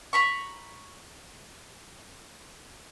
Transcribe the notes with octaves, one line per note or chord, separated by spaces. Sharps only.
A#5 B5 C#6